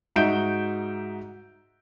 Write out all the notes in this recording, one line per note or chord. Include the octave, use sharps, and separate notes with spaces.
G#2 D#4 F#4 E5 G6 D7